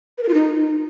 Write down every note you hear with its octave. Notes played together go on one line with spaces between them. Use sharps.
B4
A#4
F4
D#4